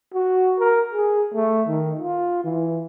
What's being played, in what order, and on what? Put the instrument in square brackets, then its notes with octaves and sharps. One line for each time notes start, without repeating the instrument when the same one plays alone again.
[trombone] F#4
A#4
G#4
A3
D#3
F4
E3